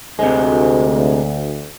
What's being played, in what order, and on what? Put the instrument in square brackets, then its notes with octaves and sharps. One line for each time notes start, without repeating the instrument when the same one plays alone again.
[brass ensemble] D2 [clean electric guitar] C3 G#3